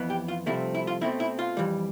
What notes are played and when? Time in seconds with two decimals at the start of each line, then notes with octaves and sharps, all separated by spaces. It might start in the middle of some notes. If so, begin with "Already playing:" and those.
Already playing: F2 E3 B3
0.10 G4
0.28 F4
0.46 C2 C3 F3 A3 C4 E4
0.75 E4
0.87 F4
1.01 B2 A3 C4 E4
1.20 E4
1.39 F4
1.57 F2 E3 G3